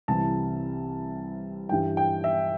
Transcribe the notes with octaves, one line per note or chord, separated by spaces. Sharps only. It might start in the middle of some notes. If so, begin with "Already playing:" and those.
C2 C3 E3 A5
G2 E3 G3 G5
G5
E5